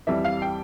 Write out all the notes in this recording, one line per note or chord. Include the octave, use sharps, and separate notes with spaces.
F2 E3 G3 E5
F5
G5